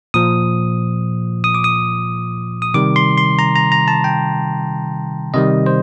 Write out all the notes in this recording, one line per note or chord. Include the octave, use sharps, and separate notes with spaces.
A#2 F3 D#6
D#6
D6
D#6
D#6
C3 D#3 G3 D6
C6
C6
A#5
A#5
A#5
A5
G5
C3 D#3 G3 D#5
C5